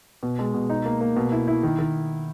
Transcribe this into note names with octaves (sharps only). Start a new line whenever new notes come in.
B2
G#3
B2
D#4
A#3
A#3
B2
E4
E4
D#3
D#3